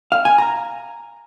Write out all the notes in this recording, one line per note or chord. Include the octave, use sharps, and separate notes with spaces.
F5
G#5
A#5